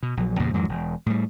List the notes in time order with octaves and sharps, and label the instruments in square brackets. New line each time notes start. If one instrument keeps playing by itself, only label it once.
[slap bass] B2
A#1 F#3
E2 G2 A#2 C#3
F2 G#2 E3 F#3
E1
A2 G3